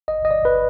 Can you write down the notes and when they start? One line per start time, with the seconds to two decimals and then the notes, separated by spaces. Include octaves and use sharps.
0.08 G1 D#5
0.25 D#5
0.31 D5
0.43 G1 B4